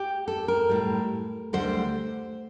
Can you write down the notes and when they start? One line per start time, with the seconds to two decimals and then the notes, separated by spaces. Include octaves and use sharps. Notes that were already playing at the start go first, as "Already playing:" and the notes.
Already playing: G4
0.28 A4
0.48 A#4
0.69 A2 G3
1.53 D2 D3 G3 C5